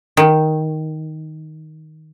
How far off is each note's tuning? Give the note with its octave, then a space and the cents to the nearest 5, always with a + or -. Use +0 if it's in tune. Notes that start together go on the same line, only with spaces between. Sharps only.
D#3 +5